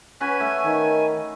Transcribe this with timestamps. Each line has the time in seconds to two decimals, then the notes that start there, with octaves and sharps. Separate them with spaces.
0.21 C#4 F#4 B4 G#5
0.40 A3
0.65 D#3